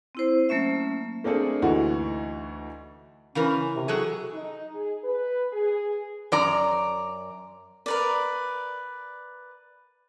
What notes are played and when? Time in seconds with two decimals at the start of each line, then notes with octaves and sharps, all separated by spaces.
0.15 C4 E4 C5
0.49 F#3 A3 A#3 C#4 E5
1.24 A3 A#3 C4 D4 G#4 A4
1.62 D2 E3 D#4 F#4
3.35 C#3 E3 C#4 A#4
3.76 C3
3.88 F#3 F#4 G#4 A4
4.33 D#4
4.74 G#4
5.03 B4
5.52 G#4
6.32 F#2 D5 A#5
7.86 A#4 B4 D5